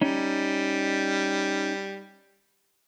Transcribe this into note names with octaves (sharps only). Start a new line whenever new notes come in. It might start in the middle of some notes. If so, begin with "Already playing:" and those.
G3 C#4 D#4